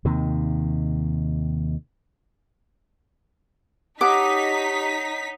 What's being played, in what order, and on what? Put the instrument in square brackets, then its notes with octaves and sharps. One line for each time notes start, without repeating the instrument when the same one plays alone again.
[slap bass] D#2 C3 D#3
[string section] D#4 B6 [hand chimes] G4 D#6 [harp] C#5 F#5 A5 [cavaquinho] D6